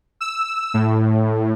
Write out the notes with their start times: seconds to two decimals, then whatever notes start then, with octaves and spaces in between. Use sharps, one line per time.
0.21 E6
0.74 A2